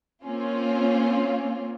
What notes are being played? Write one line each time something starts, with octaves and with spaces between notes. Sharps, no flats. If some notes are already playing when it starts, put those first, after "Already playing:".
A#3 C4 C#4 F4